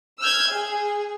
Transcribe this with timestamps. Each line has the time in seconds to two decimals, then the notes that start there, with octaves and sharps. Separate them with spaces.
0.20 E6 F6 G6 G#6
0.52 G#4